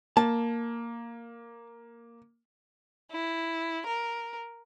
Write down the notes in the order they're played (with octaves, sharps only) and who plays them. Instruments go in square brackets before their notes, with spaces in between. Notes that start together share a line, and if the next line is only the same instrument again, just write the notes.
[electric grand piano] A#3 [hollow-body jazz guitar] A5
[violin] E4
A#4